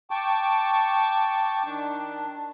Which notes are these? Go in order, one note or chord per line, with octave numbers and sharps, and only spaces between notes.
G5 A5 C#6 D6
D#3 D4